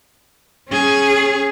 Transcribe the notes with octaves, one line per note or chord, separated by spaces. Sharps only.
C#4 G#4